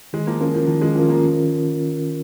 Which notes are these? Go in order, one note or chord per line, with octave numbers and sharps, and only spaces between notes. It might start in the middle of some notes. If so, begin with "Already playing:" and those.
D#3 G#3
F3 A#3
F3 C#4 F4 A#4
F3
D#3 F3
G#3
F3 C#4 F4 A#4
F3 A#3